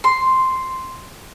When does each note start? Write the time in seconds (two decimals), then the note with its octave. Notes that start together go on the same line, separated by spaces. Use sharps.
0.04 C6